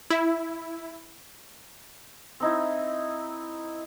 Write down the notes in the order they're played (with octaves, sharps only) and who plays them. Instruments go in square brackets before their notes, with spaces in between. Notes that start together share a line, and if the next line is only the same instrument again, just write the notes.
[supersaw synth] E4
[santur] C4 D#4 E4